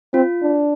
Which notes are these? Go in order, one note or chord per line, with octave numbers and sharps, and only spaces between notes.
C4 F4
D4